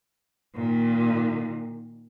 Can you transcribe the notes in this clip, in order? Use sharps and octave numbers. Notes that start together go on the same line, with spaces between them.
A#2 D#3